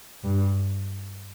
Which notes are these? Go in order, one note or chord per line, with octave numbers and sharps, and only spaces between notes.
G2